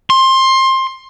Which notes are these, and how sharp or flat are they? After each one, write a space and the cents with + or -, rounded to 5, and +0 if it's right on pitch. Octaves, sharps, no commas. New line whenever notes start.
C6 +20